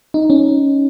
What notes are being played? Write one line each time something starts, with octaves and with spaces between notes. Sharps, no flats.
D#4
C#4